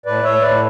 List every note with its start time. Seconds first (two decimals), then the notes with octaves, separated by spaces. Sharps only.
0.06 A2 B4 D5
0.24 A2 C#5 E5
0.42 A2 B4 D5